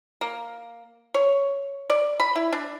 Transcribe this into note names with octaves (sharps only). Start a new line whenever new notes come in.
A#3
C#5
D5
B5
E4
D4